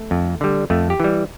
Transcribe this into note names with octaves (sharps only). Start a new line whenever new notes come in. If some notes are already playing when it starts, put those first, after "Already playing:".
Already playing: A3
F2
D3 G3
F2 A3
G4
E3 G3